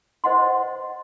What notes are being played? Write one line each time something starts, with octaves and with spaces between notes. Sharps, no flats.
C5 D#5 F#5 C6